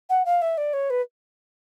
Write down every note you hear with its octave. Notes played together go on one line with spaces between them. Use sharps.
F#5
F5
E5
D5
C#5
B4